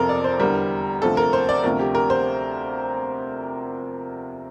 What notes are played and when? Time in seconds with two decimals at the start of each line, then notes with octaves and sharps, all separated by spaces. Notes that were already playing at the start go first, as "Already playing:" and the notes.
Already playing: F2 C3 F3 A4 A#4
0.09 D5
0.24 C5
0.40 E2 D3 G3 A#4
1.02 D2 C3 F3 A4
1.17 A#4
1.33 C5
1.49 D5
1.64 D2 C3 F3 A#4
1.79 G4
1.95 A#4
2.10 C5